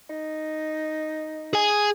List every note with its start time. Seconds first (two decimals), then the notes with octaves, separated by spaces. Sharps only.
0.10 D#4
1.53 G#4 G#5